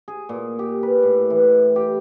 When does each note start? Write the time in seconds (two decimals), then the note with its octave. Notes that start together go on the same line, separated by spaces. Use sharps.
0.08 G#4
0.29 A#2
0.59 G4
0.83 B4
1.03 A2
1.30 E3
1.76 G4